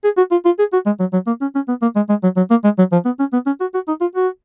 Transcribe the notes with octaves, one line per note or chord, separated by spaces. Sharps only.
G#4
F#4
F4
F4
G#4
F#4
G#3
F#3
F#3
A#3
C#4
C#4
B3
A#3
G#3
G#3
F#3
F#3
A#3
G#3
F#3
F3
B3
C#4
B3
C#4
F#4
F#4
D#4
F4
F#4